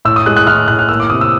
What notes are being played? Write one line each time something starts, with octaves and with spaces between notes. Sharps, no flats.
A2 E6
D#6
G#3 F#6
F#6
A2 F6
A2 F#6
F6
A#3 E6
D6
C3 D#6
E6